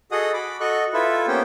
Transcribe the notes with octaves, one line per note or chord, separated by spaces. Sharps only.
F#4 G#4 A4 D#5 F#5 D#6
B5 D6
F#4 A4 D#5 C#6 F#6
E4 F4 A4 B4 E5
A#3 B3 C#4 G4 C5 G5